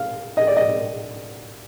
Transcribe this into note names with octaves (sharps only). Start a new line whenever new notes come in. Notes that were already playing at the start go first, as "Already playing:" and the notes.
Already playing: F5
D#5
D5
D#5